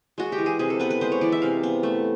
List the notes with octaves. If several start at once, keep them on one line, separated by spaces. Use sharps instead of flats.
G#3 F#4
G4
E3
G#4
C3 G#4
A4
B3 B4
B4
G#3 C5
C#5
E3 D5
E5
C3 F5
B3
A3